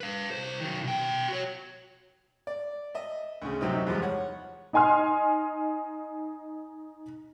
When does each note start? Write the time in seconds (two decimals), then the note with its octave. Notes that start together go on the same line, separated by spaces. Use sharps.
0.01 B4 F5
0.31 C2 C5
0.61 D#3 F#3
0.83 B2 G5
1.28 F#4 C#5
2.47 D5
2.95 D#5 E5
3.42 D2 C#3
3.61 F#2 C3 F#3 C4 D#4
3.86 E2 G#2 F3 G3 F4
4.02 C#5 F#5
4.73 D#4 D#5 G#5 C6 F6